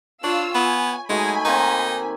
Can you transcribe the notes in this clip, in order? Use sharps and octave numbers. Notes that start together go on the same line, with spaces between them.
D4 F4 C#5 F5 E6
B3 G#5
F#3 G#3 A3 D#4 G#5 B5
D#3 A#3 C4 D#4